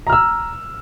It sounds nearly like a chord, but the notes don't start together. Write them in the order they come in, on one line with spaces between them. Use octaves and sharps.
A#5 F6 E6